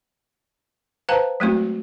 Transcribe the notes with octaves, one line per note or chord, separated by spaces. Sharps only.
B4 C5 F5 G5 A5 A#5
F#3 G#3 A3 B3 C4 F#4